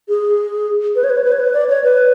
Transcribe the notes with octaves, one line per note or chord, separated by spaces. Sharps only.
G#4
B4
C#5
B4
C#5
B4
C#5
B4
D5
C#5
B4